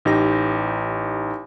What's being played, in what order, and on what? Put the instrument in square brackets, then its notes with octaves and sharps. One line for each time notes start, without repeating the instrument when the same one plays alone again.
[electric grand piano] A1 D#4 G4 A#6